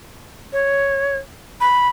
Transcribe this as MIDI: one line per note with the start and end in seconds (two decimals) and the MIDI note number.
0.53 1.18 73
1.61 1.88 83